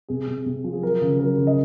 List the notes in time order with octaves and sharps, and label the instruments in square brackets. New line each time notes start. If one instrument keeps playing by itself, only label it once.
[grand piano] C3 G#4
C3
C3
F3
G#4
F#3 A#4
C#3
F#3 A#4
C#3
D#5